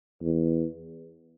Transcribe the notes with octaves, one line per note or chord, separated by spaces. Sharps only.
E2